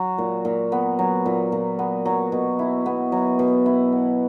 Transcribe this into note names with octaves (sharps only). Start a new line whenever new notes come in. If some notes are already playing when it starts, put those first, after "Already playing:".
Already playing: F#3
A#2
A#2
B3
F#3
A#2
A#2
B3
F#3
B2
E4
B3
F#3
B2
E4
B3